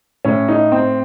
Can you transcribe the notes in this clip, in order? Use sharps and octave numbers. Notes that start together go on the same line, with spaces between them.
A2 C#4
D#4
C4